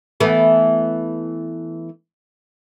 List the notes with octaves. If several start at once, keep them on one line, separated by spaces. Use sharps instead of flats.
E3 A3 B3